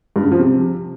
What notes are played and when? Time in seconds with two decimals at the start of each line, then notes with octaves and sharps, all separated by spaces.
0.16 G2
0.24 C#3
0.31 F3
0.39 C3